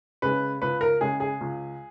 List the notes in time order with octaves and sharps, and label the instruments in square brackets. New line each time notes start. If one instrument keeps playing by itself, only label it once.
[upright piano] C#3 G#3 B4
C#2 B4
A#4
C#3 G#3 G#4
G#4
C#2